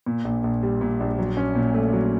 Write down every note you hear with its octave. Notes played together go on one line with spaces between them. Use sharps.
A#2
A#1
A#1
G3
A#2
A#1
F#3
C#4
A#2
A3
F#3